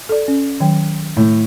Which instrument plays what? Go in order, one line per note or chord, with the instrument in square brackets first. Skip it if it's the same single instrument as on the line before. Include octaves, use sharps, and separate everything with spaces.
[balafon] A4 D5
C#4
D#3 F#3 G5
[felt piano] A2